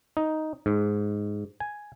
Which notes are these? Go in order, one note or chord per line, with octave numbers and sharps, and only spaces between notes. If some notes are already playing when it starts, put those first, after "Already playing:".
D#4
G#2
G#5